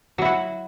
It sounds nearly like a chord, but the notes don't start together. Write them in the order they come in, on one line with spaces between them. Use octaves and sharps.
F#3 E4 F#4